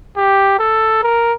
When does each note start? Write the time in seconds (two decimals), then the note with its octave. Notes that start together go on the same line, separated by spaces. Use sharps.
0.16 G4
0.59 A4
1.03 A#4